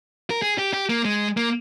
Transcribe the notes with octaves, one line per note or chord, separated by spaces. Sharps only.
A#4
G#4
G4
G4
A#3
G#3
A#3